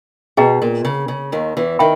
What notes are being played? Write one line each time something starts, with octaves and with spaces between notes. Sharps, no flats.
B2 G#4 D#5 G5 A#5
A#2
C#3
C#3
D#2 D#3
E2 E3
D#3 E5 G5 B5